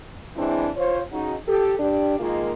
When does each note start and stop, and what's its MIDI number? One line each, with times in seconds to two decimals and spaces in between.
0.36 0.68 52
0.36 0.68 56
0.36 0.68 60
0.36 0.68 62
0.36 0.68 64
0.76 1.00 65
0.76 1.00 72
0.76 1.00 73
1.11 1.35 49
1.11 1.35 63
1.11 1.35 66
1.46 1.75 67
1.46 1.75 69
1.79 2.18 62
1.79 2.18 67
2.19 2.51 51
2.19 2.51 56
2.19 2.51 58
2.19 2.51 65